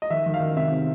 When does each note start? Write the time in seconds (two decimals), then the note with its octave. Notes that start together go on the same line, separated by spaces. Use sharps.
0.02 D#5
0.10 D#3 E5
0.26 D#3
0.34 F5
0.40 D#3
0.56 C3 E5
0.72 C3